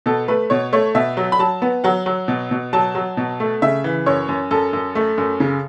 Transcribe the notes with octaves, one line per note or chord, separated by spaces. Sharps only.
B2 A4
A3 B4
B2 C#5
A3 C#5
B2 E5
F#3
B5
F#3 A5
B3
F#3 F#5
F#3
B2
B2
F#3 A5
F#3
B2
A3
C#3 E5
E3
F#2 C#5
F#2
F#2 A4
F#2
A3
F#2
C#3